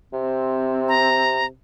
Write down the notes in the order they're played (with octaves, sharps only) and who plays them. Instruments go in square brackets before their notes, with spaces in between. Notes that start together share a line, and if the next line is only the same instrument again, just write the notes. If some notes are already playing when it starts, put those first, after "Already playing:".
[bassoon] C3 [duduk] C4
[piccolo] A#5